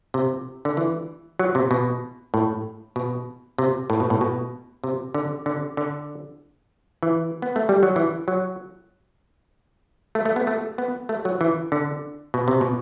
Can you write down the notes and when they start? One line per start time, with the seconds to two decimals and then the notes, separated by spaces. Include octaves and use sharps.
0.14 C3
0.65 D3
0.77 E3
1.39 F#3
1.55 C3
1.71 B2
2.34 A2
2.96 B2
3.58 C3
3.90 A2
4.00 B2
4.10 A2
4.21 B2
4.84 C3
5.14 D3
5.46 D3
5.77 D3
7.03 E3
7.42 B3
7.56 A3
7.69 G3
7.83 F#3
7.96 E3
8.28 F#3
10.15 A3
10.25 A3
10.36 B3
10.47 A3
10.78 B3
11.09 A3
11.25 F#3
11.41 E3
11.72 D3
12.34 B2
12.48 C3
12.61 B2